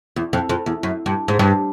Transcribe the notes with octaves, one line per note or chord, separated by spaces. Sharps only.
E2
F2
F2
E2
F#2
G2
G#2
G2